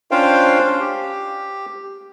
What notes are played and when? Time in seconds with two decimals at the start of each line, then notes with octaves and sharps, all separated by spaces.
0.11 C#4 D4 F4 C5 F5 G5
0.80 G4